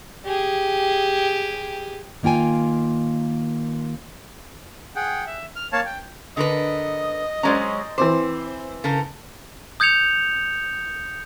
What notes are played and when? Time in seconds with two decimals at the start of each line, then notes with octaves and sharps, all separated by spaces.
0.25 G4 G#4
2.23 D#3 A#3 F4 G5 G#5
4.96 G#4 F#5 G5
5.27 E5
5.56 F6
5.73 A#3 C#5 F5 A5
5.85 G5
6.37 D3 A#4 B4 D#5
7.43 F#3 G#3 C#4 C5 D5 A#5
7.98 E3 C4 C5 D6
8.84 C#3 A4 A#4
9.80 D#6 G6 G#6 C#7 F7